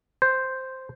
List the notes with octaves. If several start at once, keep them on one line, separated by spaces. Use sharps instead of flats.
C5